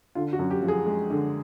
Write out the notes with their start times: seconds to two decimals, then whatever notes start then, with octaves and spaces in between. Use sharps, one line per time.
0.15 D3 F4
0.33 F#4
0.39 F#2
0.51 G4
0.63 F3
0.68 G#4
0.86 G#3
1.10 D3